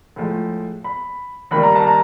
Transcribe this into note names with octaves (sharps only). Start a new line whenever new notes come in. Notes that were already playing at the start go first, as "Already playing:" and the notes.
A2 F3 G#3
B5
D#2 D#3 G3 B5
A#5
A5
A#5